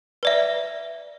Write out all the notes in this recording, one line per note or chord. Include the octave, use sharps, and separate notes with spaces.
B4 D5 E5